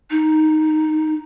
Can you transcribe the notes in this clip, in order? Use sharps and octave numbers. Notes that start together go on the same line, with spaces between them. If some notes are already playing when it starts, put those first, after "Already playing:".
D#4